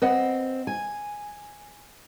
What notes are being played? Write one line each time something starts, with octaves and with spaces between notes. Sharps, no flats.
C4 B4 D#5 F#5
G#5